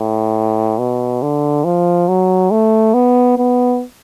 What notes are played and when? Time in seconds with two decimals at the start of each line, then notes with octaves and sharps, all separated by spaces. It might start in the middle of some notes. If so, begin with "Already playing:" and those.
Already playing: A2
0.78 B2
1.22 D3
1.64 F3
2.08 F#3
2.51 A3
2.94 B3
3.38 B3